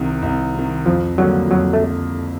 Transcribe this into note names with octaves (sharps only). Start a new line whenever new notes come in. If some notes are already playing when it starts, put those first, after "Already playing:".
Already playing: C2 C3 D#3
C2
C3 D#3
F2 F3
D3 F#3 G3 A#3
F2 F#3
A3